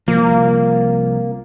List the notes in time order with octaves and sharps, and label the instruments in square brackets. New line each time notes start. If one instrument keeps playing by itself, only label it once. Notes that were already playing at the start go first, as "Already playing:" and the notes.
[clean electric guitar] C2 F3 [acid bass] A#3